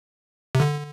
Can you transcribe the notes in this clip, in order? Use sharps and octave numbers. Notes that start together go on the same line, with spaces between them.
C3
D3